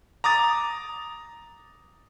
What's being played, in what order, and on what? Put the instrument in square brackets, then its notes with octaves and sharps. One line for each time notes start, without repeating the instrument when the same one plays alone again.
[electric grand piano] A#5 D6 D#6 A6